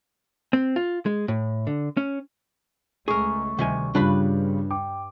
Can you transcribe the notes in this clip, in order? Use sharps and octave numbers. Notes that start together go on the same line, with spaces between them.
C4
F4
G#3
A2
D3
C#4
C#2 G#3 A3 G#4 A#4 C#6
D2 C3 D#3 G3 G#5
G2 C#3 G3 D4 F4 B4 B5
G5 D6